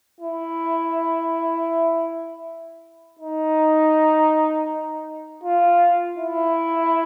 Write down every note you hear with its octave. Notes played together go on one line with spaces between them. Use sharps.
E4
D#4
F4
E4